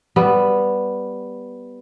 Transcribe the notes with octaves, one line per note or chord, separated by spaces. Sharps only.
G3 B3